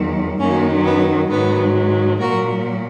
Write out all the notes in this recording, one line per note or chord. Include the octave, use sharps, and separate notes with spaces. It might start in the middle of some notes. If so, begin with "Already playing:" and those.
Already playing: E2 D#3 F#3
F#2 D#3 F#3 A#3 C#4
B3
G#2 D#3 F#3 B3
A#2 F#3 F#4 A#4